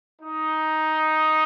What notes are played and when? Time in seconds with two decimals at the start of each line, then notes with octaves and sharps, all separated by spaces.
0.20 D#4